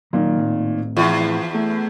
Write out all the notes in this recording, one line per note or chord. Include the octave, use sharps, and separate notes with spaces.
A#2 D#3 F#3 A#3 C4
A2 C4
E2 F3 E4 F4
A3